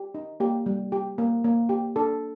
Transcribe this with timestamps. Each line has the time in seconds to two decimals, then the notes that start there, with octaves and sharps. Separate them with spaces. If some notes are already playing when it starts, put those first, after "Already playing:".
Already playing: G4
0.15 D#4
0.40 A#3 G4
0.66 G3
0.92 G4
1.18 A#3
1.44 A#3
1.69 G4
1.96 D4 A4